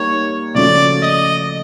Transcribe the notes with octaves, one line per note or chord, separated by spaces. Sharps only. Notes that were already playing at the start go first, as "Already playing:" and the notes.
Already playing: G3 A#3 D#4 C#5
C#3 F3 A3 C#4 F#4 D5
D#5